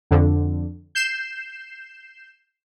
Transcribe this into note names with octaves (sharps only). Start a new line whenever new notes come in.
F2 D3
G6 C7 E7